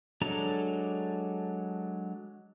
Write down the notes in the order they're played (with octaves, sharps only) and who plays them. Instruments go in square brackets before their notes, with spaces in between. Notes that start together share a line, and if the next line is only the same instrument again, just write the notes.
[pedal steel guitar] F#3 G#3 D4 A4 A#5